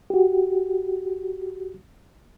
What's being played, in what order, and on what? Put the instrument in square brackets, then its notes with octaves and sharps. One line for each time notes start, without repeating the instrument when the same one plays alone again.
[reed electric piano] F#4 G4